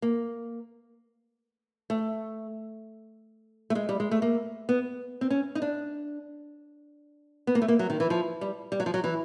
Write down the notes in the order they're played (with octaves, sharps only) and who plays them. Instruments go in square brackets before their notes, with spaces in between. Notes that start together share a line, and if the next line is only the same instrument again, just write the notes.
[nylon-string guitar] A#3
A3
A3
G#3
G3
G#3
A3
A#3
B3
C4
C#4
D#4
D4
B3
A#3
A3
A#3
F#3
D#3
E3
F3
G3
G3
F#3
F3
F#3
E3